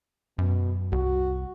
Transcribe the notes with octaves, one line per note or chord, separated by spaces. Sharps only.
F#2 B2
C2 F#4